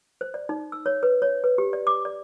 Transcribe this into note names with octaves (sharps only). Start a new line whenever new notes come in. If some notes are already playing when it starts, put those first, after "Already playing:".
C5
D5
D#4
E6
C#5
B4
C#5
B4
G4
D5
D6
D5